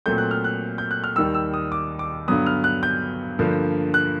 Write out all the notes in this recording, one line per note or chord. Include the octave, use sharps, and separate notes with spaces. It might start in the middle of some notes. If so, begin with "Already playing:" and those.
A#2 F#3 A3 C4 G6
F#6
F6
F#6
G6
F#6
F6
D#2 D#3 G3 E6
E6
D#6
D6
D6
G2 D3 F#3 B3 D#6
F6
F#6
G6
G2 D3 F3 A#3
F#6